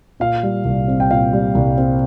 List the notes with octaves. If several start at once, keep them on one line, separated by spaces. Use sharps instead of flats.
A#2 F5
G3
C2
C4
G5
A#2 F5
G3
C2
C4